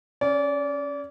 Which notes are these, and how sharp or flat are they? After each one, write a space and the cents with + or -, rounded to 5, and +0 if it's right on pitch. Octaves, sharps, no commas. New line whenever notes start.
C#4 +0 D5 -30